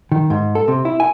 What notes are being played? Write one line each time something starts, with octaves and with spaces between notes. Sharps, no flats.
D#3
G#2
A4
C3
E4
G#5